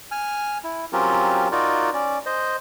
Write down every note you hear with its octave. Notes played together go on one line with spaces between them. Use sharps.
G#5 F6
E4
F#3 C4 C#4 F4 G4 A#4
D#4 F4 F#4 A#4 D5
C#4 D5
C5 D#5